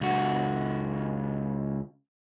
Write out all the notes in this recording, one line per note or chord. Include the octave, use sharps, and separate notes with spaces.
C#2 F#4